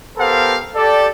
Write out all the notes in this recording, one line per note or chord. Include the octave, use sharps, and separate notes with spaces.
B3 G4 A4 A#4 C5 F5
G4 A4 D5